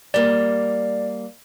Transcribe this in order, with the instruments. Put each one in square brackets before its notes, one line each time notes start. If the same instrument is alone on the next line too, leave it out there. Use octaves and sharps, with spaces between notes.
[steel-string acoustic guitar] G3 A#3 [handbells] D5